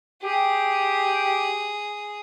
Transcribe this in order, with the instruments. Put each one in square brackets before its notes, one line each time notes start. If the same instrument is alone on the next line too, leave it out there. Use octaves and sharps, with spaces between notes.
[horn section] G4 [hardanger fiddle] G#4